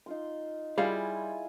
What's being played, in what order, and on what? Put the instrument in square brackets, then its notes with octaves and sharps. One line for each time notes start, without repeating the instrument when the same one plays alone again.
[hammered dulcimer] D#4 F4 C6
[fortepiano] G3 [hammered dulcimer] E4 F4 G#5 [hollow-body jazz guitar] G#4 F5